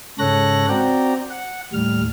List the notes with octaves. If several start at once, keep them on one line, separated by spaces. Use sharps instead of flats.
G#2 C#3 A4 C#5 F#6 A#6
C4 F#4 D5 G5 A#5
F#5
D#2 A2 G3 F6